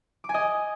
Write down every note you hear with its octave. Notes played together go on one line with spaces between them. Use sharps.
D6
G#5
D#5